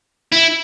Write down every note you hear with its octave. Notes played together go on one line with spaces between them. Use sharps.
E4